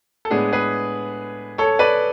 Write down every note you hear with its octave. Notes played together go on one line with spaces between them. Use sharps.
A4
A2 G#3 B3 D4 G#4
G#4 B4
A4 C#5
B4 D5